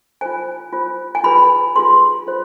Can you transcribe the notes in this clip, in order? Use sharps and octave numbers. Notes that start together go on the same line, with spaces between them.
F4 C5 G#5
F4 C5
G#5
F4 G#4 B4 B5
F4 G#4 B4 C6
F4 C5